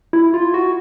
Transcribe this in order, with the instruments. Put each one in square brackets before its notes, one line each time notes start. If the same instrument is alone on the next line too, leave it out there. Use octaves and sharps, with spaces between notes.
[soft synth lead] E4
F4
F#4